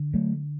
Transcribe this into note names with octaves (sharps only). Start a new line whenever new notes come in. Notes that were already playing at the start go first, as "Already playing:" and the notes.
Already playing: D3
F#3 A3